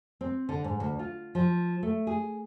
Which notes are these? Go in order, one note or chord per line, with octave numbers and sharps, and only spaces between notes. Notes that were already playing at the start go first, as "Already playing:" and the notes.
C4
D3
G#2
D2
F4
F3
A3
G#4